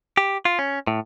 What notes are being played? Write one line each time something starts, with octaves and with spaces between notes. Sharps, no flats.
G4
F4
C#4
A2